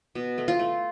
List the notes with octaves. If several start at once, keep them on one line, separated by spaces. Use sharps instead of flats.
B2
A3
F4
A3